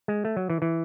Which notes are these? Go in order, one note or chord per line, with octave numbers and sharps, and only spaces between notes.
G#3
A3
F#3
E3
E3